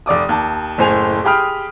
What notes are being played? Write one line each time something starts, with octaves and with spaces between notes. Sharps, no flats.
F1 D5 D6 D#6
D#2 A5
F#1 A2 C5 G#5 F7
G4 G#4 G5 B5 D#6 F6